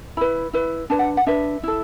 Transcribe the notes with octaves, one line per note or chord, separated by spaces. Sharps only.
E4 B4 B5
E4 B4
D4 B4 A5
F#5
F#5
D4 B4 E5
E4 A4